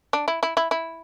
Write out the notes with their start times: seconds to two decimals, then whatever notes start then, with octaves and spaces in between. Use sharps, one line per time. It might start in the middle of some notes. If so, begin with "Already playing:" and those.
0.13 D4
0.28 E4
0.43 E4
0.57 E4
0.71 E4